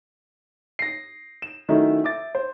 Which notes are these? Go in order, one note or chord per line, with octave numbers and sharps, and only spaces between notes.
A#6 C7
E7
D#3 F#3 A3 C#4 D#4 E4
E5 D6 A6
C5